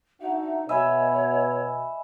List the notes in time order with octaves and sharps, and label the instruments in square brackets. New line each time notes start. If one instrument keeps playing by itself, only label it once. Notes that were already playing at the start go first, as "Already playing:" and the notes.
[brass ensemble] D4 F#4 E5 [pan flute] D#4
[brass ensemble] B2 [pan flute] C#5 [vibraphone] D#5 G#5 B5 [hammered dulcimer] E5